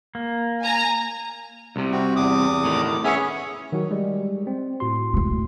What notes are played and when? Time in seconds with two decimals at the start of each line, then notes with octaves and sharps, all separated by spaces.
0.15 A#3
0.63 G#5 A#5
1.76 C2 C3
1.91 C4 F#4
2.16 E2 D6 D#6
2.64 A2 D#3
3.04 B3 C#4 G#4 C#5 E5
3.72 D#3 F#3 F#4
3.91 G3 G#3
4.47 C4
4.80 A2 F#4 C6
5.14 D1 G#2